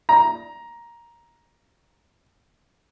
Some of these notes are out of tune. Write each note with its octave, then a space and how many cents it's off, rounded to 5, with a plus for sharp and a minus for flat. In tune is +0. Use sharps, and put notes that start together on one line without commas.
A#5 +10